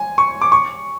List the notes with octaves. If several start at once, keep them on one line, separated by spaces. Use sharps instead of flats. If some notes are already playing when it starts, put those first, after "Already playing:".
Already playing: G#5
C#6
D6
C#6